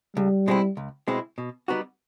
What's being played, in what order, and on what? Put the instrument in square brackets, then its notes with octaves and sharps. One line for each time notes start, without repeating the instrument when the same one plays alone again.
[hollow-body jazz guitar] C#2 [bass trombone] G3
[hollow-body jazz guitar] B2 G#3 C4 E4
C#2
B2 G#3 C4 E4
B2
G3 B3 D#4 F#4